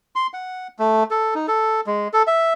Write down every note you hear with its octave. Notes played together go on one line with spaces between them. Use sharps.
C6
F#5
A3
A4
D#4
A4
G#3
A4
E5